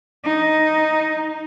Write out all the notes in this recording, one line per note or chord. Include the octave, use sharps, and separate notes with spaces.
D#4